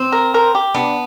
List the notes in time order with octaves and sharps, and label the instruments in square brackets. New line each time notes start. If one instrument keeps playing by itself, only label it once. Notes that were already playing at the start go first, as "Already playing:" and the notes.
Already playing: [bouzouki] C4
[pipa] A#4
A#4
G4
[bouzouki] B3 [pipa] D4